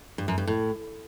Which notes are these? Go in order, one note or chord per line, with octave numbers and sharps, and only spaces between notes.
G2
F#2
G2
A2